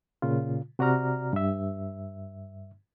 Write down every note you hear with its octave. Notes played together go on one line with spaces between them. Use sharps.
A#2 C#3 F4
C3 F#4 D5 A#5 F6
G2 E5